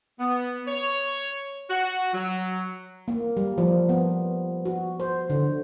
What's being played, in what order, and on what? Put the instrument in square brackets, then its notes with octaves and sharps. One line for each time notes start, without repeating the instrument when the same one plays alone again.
[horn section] B3
C#5
F#4
F#3
[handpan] A#3
G3
F3
B3
F#4
C5
D3